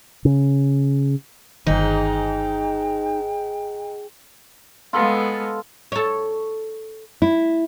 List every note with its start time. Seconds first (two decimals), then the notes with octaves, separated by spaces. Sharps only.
0.25 C#3
1.66 G1 G#2 D#3 D#4 G5
4.93 G#3 B3 F4 A4
5.92 A4 C#5
7.22 E4